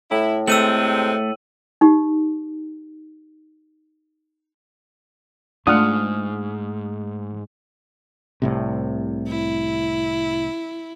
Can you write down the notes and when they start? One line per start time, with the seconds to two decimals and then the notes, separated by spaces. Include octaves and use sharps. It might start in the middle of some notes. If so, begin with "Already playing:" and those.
0.11 A2 E4
0.48 C3 G#3 A3 C4 E6 D#7 F#7
1.81 D#4 G4
5.67 G#2 A3 D4 F4 F#5 D#6 F6
8.42 C2 A2 C3
9.28 E4